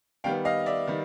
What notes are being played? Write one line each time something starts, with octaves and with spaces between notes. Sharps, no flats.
D#3 G3 B3 F5 G5
D#5 F5
D5 E5
D#3 G3